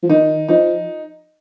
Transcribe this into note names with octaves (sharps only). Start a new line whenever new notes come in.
F3
D#3 D#4
F3 D#4